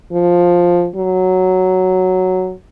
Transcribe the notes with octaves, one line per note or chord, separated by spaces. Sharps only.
F3
F#3